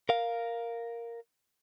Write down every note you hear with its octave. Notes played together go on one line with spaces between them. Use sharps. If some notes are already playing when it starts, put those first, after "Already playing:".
A#4 F5